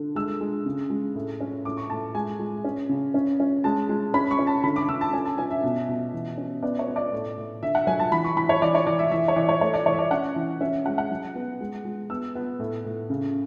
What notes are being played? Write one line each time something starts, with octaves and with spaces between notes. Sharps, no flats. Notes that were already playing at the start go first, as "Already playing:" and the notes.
Already playing: D3
G#3 E6
G#3
C#3
G#3
A2
C#4
A2 D6
C#6
A2 A5
G#3 G#5
G#3
C#4
C#3
C#4
C#4
G#3 A5
G#3
C#4 B5
C#6
C#4
A5
D3 B5
D6
D3 E6
A5
C#4 G#5
A5
C#4 G#5
E5
B2
B2
E3
C#4
B3 D5
C#5
B3
D5
A2
A2
D3 E5
F#5
F#3 G#5
A5
E3 B5
C#6
E3 B5
C#5
E3 D5
C#5
E3 D5
E5
E3 E5
C#5
E3 D5
C#5
A3 C#5
D5
E3 C#5
E5
D5
C#4 F#5
E3
C#4 E5
E5
G#3 F#5
F#5
F#3
B3
G#3
G#3
B3 E6
B3
A2
A2
C#3